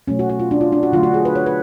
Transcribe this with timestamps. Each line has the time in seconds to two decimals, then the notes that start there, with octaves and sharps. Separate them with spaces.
0.08 B2 F#3 A3 C#4
0.19 F#4
0.30 F#4
0.40 F4
0.51 D4
0.61 F4
0.72 D4
0.83 F#4
0.93 D3 F#3 A3 F4
1.03 F#4
1.14 G#4
1.25 B4
1.35 C#5
1.46 B4